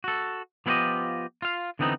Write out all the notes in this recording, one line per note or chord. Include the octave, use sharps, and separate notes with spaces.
F#4 A4
F3 B3 E4 F4 G4 D#5
F4 F5
D3 E3 B3 C4 D#4